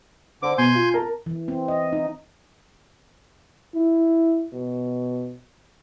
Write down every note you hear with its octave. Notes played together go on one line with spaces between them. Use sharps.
D3 C5 D6
B2 G#5 C6 G6
F4
A#4 A5
E3
C4
D#5
D#4
E4
B2